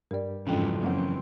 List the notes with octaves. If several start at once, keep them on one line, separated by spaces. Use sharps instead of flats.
G2 G3 A#4 D5
F2 G#2 C#3 E3 F#3 C#4 D4 G5
F#2 F3 A#3 C4 C#4 A#4 F#5